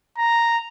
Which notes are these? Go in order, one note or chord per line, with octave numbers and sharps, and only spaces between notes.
A#5